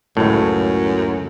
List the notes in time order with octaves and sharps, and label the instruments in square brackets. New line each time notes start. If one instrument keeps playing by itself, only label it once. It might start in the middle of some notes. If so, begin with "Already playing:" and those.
[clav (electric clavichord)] C#2 A2 [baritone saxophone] F#2